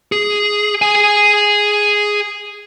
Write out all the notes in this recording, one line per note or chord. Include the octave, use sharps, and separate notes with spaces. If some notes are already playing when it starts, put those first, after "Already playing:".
G#4
G#4 G#5